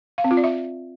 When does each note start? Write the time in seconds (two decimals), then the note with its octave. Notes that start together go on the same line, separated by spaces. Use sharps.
0.18 F5
0.24 C4
0.31 F4
0.37 D5
0.44 E5